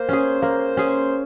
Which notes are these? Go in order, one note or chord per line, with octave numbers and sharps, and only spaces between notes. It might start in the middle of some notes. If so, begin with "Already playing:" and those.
Already playing: A#3 C5
C#4 G#4
A#3
C#4 G#4